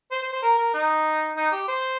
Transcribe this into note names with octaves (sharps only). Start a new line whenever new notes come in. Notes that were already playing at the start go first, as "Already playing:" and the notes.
C5
C5
C5
A#4
A#4
D#4
D#4
G4
C5